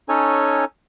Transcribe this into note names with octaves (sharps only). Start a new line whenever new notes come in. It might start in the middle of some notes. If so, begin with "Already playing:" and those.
C#4 D#4 A4 C#5 G#5